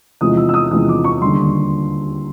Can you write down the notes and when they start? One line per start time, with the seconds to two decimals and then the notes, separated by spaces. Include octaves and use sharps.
0.21 E2 C3 F3 G#3 D#6
0.37 E6
0.49 E6
0.54 D#6
0.71 E2 C3 F3 G#3 D#6
0.89 D6
1.04 C#6
1.21 D#2 D3 G3 C6